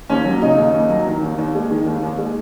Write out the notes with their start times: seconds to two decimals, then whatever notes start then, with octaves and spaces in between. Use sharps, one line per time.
0.09 D#2 C#4
0.25 F#3
0.42 C#3 D#4
0.58 D#2
0.74 D#2
0.90 F#3
1.06 D#3
1.22 D#2
1.38 D#2
1.55 G#3
1.70 D#3
1.86 D#2
2.03 D#2
2.18 G#3